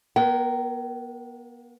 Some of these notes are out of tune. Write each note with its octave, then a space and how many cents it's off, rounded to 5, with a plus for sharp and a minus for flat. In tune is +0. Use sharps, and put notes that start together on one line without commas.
B3 -40 A#4 +0 G5 -35